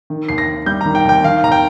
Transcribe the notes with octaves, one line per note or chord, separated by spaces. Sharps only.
D#3
D#2 C7
A#6
D#2
G3 G6
D#3 A#5
G5
D#2 G5
D#3 F5
D#2 A#5
G5